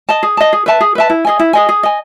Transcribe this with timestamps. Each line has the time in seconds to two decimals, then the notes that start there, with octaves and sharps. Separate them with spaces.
0.09 D#5 A5
0.23 G#4
0.37 D#5 A5
0.53 G#4
0.66 B4 E5 A5
0.81 G#4
0.95 B4 E5 A5
1.10 E4
1.25 G#4 D#5 G#5
1.39 E4
1.53 G#4 D#5 G#5
1.69 G#4
1.83 D#5 G#5